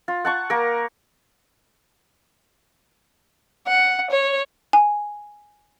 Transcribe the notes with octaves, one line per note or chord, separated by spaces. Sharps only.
F4
F#5 A5 C#6
A#3 A#4
F#5
C#5
G#5